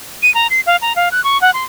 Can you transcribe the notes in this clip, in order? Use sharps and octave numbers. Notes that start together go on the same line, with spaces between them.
D#7
A#5
C7
F5
A#5
F5
F#6
C#6
F#5
C6